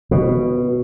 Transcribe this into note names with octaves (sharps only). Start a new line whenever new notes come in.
B2